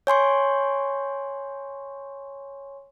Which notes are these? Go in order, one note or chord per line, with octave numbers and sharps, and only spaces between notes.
C#5 G#5 C6 C#6